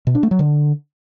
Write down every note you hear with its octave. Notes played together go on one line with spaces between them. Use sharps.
B2
D4
A3
F#3
D3